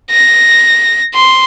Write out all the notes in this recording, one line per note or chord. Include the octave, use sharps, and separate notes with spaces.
A#6
C6